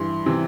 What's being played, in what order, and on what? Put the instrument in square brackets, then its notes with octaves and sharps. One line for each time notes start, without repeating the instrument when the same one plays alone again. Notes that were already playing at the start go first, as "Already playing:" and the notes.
Already playing: [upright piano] G2 E3 C6
C3 E3